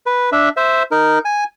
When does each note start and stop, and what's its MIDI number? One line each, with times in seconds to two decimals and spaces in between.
0.06 0.30 71
0.32 0.49 62
0.32 0.49 76
0.57 0.83 72
0.57 0.83 76
0.91 1.19 63
0.91 1.19 70
1.25 1.44 80